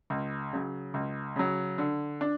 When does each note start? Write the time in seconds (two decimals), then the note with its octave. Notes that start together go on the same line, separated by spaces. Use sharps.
0.10 C#2
0.53 C#3 F#3
0.94 C#2
1.36 C#3 F#3
1.78 D3
2.21 D4